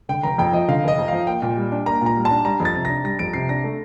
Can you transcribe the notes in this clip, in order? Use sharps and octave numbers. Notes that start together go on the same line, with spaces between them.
D3 G5
F1 A#5
F2 G5
F3 D#5
D3 F5
F1 D#5
F2
F3 F5
A#3 G5
A#2
G3
D4
A#3 A#5
A#2 A#5
G3
A5
D4
G3 A#5
F2
A6
C3
D4 A#6
G3 A#6
F2 D7
C3 C7
D4 A#6
A3